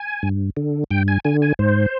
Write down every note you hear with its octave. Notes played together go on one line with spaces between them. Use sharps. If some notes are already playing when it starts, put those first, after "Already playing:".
Already playing: G#5
G2
D3
G2 G5
G#5
D3 G#5
G#5
G#2 C5